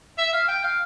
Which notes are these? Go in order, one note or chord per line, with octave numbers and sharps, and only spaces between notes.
E5
F5
G5
F5